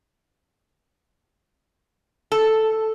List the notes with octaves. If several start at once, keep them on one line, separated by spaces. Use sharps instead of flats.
A4